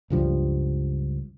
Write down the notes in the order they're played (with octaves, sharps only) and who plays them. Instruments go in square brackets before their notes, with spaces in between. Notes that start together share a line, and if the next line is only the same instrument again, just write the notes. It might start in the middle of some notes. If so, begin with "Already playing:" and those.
[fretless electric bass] C#2 G2 F3 G3